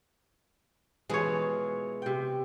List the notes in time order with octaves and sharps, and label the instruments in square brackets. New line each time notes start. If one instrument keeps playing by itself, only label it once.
[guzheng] B2 E3 F3 [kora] G#3 C#5
[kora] C3 G5